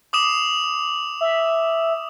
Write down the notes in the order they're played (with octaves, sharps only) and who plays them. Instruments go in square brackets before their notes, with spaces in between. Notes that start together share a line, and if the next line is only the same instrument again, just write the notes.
[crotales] D6 D#6 E7
[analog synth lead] E5